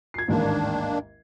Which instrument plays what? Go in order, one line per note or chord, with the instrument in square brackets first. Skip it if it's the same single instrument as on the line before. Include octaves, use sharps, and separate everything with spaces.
[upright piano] G#6 C7
[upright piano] A1 D#2 G#2 [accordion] D#3 A#3 D4